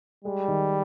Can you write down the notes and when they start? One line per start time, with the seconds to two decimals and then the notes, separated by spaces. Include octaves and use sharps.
0.24 G3 G#3
0.48 D#3